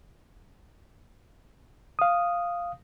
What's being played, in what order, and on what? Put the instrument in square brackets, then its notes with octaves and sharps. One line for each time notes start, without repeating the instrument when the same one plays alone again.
[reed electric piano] F5 D#6